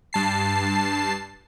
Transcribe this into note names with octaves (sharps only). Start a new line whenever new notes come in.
G2 A5 C7